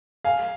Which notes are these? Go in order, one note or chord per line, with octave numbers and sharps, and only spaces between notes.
F5 G#5